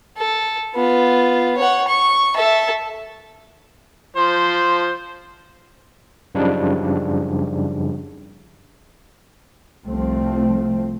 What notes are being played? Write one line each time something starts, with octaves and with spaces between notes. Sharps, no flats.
A4
B3 F4
C#5 F#5
C#6
A4 E5
F3 C5
F#2 C#3 F3 G3 D4 D#4
C2 F3 A3 C4